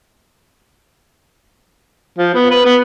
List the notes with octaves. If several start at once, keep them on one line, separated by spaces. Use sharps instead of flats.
F3
B3
B4
B3